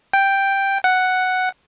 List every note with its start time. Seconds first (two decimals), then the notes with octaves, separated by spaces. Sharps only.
0.13 G5
0.84 F#5